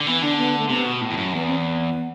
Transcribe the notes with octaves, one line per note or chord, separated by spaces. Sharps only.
D3
E3 B3
D3 D4
B3
A3
C3 B3
B2
A2
E2
F#2
E2 B3
C4
C4
B3